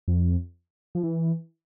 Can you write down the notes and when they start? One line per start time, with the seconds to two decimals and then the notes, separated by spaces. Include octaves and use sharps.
0.08 F2
0.95 F3
1.03 E3